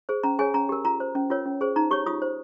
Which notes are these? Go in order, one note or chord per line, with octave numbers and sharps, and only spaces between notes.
G#4 C5
C#4 A#5
G#4 C#5 G#5
C#4 A#5
G4 A#4
F4 A#5
C5
C#4
F4 A#4 C#5
C#4
G#4 C5
D#4 A#5
G4 C#5 C#6
F4 D#6
C5